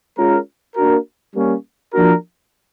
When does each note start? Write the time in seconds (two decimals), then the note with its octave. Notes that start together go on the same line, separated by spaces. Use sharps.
0.17 G#3 C#4 F4 A#4
0.76 A#3 D4 F#4 A#4
1.34 G3 A#3 C#4
1.93 F3 A#3 D4 F#4 A#4